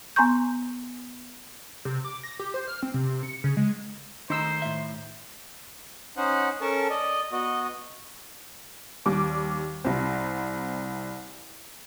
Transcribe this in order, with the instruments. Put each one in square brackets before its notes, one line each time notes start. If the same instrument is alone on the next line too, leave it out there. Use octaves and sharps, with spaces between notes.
[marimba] B3 G#5 A#5 C6 C#6 G6
[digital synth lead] C3
D6
A#6
G4
C5
F6
C4
C3
C#7
C#3
G#3
[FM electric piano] D#3 A3 [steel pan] D#4 E6 [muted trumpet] C5
[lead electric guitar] A2 E5
[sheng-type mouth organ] C#4 D#4 C5 F#5
C#4 A4 A#4 A5 C#6
D5 D#5
B3 F#4 D#5
[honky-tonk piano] D#2 G3 D6
C2 C4